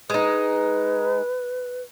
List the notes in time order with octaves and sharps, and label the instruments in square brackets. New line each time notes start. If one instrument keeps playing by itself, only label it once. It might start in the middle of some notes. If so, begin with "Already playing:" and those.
[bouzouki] G#3 D#4 [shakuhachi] B4